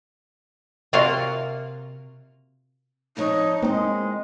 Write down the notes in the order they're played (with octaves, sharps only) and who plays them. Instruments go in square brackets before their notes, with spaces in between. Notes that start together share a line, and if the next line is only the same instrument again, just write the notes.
[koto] C3 A#3 F4 F#4 F5
[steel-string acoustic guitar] F2 D4 C#5 [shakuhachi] D#4
[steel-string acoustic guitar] E2 D#5 [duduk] G#3 [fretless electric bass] A#3 C4